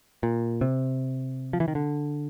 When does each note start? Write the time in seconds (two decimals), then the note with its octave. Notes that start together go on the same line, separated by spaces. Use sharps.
0.23 A#2
0.61 C3
1.53 F3
1.60 E3
1.68 D#3
1.75 D3